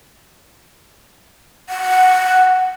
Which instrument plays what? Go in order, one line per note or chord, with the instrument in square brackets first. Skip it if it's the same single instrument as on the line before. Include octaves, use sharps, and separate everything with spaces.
[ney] F#5